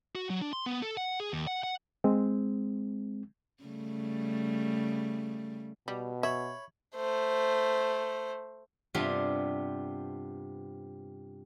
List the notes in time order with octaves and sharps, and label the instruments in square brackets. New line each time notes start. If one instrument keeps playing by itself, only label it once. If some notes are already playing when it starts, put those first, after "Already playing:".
[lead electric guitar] F#4
F#3
D4
C6
B3
A4
F#5
G#4
D#2
F#5
F#5
[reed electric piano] G#3 C4
[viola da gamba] C#3 G3 A3
[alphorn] B2 [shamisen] G3
[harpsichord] C#5 B5 [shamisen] E5
[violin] A3 C5
[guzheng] G2 C3 G3 B3 F4